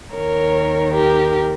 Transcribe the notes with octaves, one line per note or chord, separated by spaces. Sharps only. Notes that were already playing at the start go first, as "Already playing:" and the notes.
D#2 D#3 A#4 C#5
G4 A#4